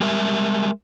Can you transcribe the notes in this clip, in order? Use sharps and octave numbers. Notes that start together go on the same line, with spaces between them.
G3 G#3 A#4 E5